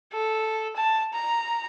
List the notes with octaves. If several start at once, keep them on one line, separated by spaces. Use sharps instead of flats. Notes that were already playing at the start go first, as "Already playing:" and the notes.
A4
A5
A#5